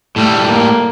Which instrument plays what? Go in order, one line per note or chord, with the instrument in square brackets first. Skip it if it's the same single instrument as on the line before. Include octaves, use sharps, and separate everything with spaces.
[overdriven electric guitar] A2 G3 [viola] A3
[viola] A#3